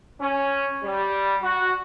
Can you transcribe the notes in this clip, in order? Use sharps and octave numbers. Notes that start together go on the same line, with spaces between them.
C#4
G3
F#4